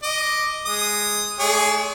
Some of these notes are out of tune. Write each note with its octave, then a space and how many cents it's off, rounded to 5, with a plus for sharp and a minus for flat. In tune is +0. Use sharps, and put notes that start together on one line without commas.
D#5 +0 D6 +0
G#3 +0 D#6 +0
A3 -30 G#4 +0 C#5 +45